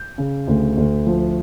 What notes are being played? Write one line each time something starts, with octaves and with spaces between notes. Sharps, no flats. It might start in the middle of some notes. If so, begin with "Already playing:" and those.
Already playing: G6
C#3
D2
D2
F3